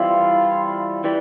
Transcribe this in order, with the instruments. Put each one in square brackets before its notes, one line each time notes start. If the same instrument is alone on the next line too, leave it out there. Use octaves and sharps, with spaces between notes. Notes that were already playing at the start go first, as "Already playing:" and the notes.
Already playing: [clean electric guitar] E3 G3 C4 E4 [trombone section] F4
[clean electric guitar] E3 G3